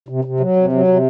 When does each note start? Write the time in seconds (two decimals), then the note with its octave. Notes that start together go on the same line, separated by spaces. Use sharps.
0.08 C3
0.25 C3
0.40 F#3
0.56 C3
0.72 F#3
0.87 C3